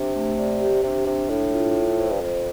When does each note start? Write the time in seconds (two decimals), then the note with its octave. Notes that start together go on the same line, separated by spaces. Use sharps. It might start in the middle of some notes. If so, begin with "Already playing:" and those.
Already playing: C3 D4
0.15 A3
0.38 D5
0.61 G4
0.83 C3 D4
1.07 C3 D4
1.30 A2 D4
1.53 F4
1.75 F4
1.98 C5
2.12 G2
2.21 F2 C5